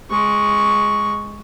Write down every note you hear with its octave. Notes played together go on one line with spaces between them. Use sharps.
G#3 C#6